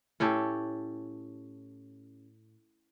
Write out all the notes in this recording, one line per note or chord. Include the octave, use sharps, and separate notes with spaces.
A2 C#4 G4 A4